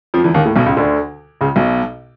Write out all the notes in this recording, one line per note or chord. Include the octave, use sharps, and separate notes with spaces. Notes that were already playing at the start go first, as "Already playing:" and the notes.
F2 F3
E2 E3
D#2 D#3
A2
B1 B2
C#2 C#3
D2 D3
C#2 C#3
B1 B2